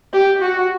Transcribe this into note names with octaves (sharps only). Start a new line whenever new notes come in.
G4
F#4